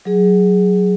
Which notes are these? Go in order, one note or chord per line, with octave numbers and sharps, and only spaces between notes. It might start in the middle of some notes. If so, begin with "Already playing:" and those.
F#3 G#4